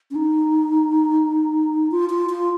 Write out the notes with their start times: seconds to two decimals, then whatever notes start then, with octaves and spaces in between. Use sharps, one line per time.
0.11 C#4
0.15 D#4
1.91 F4
2.10 F4
2.29 F4